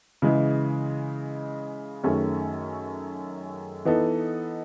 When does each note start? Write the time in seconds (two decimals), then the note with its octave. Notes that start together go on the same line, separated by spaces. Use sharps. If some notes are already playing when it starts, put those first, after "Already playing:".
0.22 C#3 E3 G#3
2.03 F#2 D#3 A3 C#4 G#4
3.85 E3 B3 D#4 A4